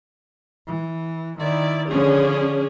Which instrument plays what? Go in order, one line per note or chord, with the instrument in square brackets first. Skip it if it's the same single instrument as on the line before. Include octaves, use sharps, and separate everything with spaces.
[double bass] E3
[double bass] D#3 [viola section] E4 D5
[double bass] D3 F3 [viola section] C#4 D4 G#4